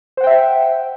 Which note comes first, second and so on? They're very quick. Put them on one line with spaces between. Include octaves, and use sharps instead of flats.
C5 F#5 G5 E5